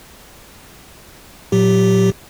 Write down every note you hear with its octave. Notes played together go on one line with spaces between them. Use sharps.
A#2 F#3 G4